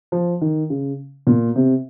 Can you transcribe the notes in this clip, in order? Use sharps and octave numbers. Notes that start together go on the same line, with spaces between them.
F3
D#3
C#3
A#2
C3